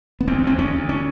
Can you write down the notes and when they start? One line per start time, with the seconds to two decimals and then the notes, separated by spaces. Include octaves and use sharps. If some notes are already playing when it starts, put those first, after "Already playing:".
0.21 B3
0.27 D2 C4
0.43 D2 C4
0.58 D2 C#4
0.74 D2
0.89 C#4